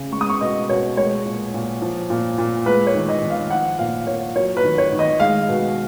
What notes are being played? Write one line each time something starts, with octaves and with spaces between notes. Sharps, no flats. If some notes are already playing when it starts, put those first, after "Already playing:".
Already playing: C#3
G#3 C#6
D#6
C#6
B2 D#5
B2 C#5
G#3 C#5
A#2
A#2
F3
A#2
A#2
G#3 B4
C#5
D#3
D#5
D#3
F5
F3 F#5
A#2 F5
A#2 C#5
F#3 C#5
B4
D#3
C#5
D#3
D#5
G#3 F5
B2